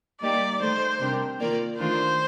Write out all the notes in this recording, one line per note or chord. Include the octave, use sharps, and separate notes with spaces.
G3 A#3 D#4 G4 D5
D#3 A3 D#4 C5
C3 G3 D4 G4 A#4
D#3 A#3 F4 A#4 D5
D#3 A3 D4 F4 A#4 C5